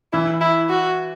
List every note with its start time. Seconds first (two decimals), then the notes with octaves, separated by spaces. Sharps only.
0.13 E3 E4
0.41 E4
0.69 F#4